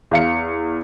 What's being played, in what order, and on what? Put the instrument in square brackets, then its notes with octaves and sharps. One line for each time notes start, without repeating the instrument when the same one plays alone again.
[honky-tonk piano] E2 F5 C#7